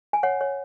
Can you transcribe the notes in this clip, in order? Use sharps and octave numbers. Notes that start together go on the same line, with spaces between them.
G#5
C#5 F#5
C#5